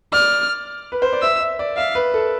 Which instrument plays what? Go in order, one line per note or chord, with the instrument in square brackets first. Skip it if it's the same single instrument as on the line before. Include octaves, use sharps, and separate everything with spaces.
[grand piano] D5 [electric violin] F6
[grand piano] B4
C5
D5
[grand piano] E5 [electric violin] E6
[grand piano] E5
D5
[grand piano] E5 [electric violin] F5
[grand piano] B4
A4